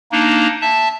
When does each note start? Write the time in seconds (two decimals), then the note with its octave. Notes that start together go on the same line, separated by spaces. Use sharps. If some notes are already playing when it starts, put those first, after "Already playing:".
0.12 A#3 D4 D#4
0.61 E5 A5